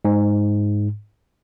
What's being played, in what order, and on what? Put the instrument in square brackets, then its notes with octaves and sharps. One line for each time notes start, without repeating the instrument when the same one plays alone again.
[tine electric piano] G#2